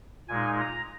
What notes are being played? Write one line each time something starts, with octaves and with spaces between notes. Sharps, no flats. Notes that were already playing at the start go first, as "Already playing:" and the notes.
A#2 G#3 D#4 G#5
A#5